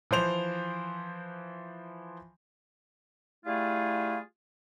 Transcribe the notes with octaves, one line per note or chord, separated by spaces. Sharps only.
E3 F3 C5 F7
G3 A3 E4 F4 G#4 F5